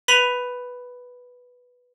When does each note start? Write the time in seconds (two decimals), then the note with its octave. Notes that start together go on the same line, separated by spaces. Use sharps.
0.08 B4 B5 B6 D#7 F7